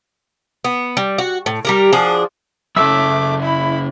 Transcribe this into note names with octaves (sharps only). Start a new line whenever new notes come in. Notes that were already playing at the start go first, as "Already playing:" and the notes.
B3
G3
F#4
A2
G3 G4 A#4
F3 D4 F#4 G#4
F#2 C#3 A3 E5 D6 E6
E4 B5